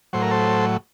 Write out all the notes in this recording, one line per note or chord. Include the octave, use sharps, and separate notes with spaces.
A2 F#3 C5
A#4
A4 C5